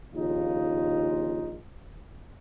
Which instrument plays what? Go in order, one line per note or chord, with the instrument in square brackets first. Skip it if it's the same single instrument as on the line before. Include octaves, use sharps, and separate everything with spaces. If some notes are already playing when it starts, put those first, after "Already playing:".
[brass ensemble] A#1 D#2 C#3 D#4 F4